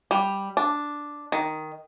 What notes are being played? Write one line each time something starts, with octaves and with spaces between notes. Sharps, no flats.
G3
D4
D#3